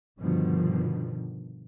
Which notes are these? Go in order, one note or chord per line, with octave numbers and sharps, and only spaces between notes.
G2 B2 D3 D#3 F3